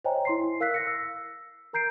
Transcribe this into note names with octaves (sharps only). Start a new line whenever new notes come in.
C5 C#5 D#5 G5 G#5 A#5
E4 C6 C7
A#4 F5 E6 F#6 B6 C7
A#6 C#7
E6
A#4 A#5 G6 C7 D7